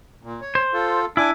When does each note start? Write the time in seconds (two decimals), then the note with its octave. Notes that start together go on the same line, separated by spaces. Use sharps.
0.23 A#2
0.41 C#5
0.55 C5
0.73 F4 A4
1.17 D4 E4 G#5 D6